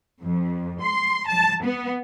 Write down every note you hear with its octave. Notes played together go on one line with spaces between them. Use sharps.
F2
C6
A5
B3